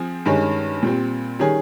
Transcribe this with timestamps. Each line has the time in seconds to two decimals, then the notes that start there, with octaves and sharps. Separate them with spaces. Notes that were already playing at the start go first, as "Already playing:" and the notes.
Already playing: F3 C4 G#4
0.26 G2 D#3 G#3 C#4
0.83 A#2 G3 C4
1.39 D#3 G3 C#4 G#4